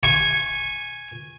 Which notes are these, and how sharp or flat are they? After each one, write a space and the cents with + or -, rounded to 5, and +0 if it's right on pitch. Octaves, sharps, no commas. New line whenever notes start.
G#5 +0 C#6 -20